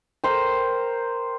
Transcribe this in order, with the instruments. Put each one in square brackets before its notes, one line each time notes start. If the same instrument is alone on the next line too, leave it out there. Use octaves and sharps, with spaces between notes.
[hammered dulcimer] A#4 C5 G5